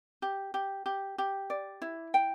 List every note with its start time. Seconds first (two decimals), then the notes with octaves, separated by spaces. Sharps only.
0.22 G4
0.54 G4
0.86 G4
1.18 G4
1.50 D5
1.82 E4
2.14 G5